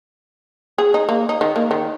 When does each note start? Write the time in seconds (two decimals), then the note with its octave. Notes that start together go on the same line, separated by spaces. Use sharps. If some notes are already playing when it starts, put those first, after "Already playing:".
0.78 G#4
0.94 D#4
1.09 A#3
1.29 D#4
1.41 D#3
1.56 A#3
1.71 D#3